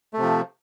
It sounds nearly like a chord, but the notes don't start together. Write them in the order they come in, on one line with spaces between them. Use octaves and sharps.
A3 C3 F3